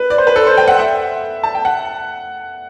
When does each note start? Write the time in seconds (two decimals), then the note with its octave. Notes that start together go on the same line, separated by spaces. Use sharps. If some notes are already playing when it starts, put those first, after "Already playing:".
Already playing: B4
0.10 D5
0.18 C5
0.27 B4
0.36 A4
0.47 C5
0.57 G5
0.68 F#5
0.78 E5
1.43 A5
1.55 G5
1.65 F#5